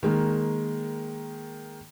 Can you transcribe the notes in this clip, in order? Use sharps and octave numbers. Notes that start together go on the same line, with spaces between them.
D#3 G#3 A#3